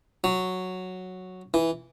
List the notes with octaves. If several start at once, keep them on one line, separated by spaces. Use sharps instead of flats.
F#3
E3